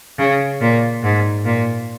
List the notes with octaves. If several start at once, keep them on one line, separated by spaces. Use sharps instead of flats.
C#3
A#2
G#2
A#2